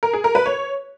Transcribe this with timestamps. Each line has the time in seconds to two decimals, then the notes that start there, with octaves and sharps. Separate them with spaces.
0.03 A#4
0.13 G#4
0.24 A#4
0.35 B4
0.46 C#5